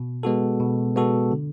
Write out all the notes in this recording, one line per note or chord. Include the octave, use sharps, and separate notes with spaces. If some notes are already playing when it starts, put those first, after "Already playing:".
Already playing: B2
G#3 B3 F#4 A4
B2
G#3 B3 F#4 A4
D3